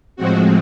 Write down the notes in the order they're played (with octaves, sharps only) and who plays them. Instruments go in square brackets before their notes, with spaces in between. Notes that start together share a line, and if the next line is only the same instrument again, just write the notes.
[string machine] A2 F3 G#3 C4 F#4